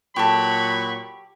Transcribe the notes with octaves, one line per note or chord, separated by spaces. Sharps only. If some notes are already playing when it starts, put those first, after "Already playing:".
A#2 F#3 G4 A4 B5 C#6